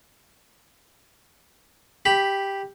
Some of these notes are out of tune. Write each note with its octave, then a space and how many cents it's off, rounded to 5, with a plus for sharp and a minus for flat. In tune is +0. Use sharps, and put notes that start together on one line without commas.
G4 +0 B5 +0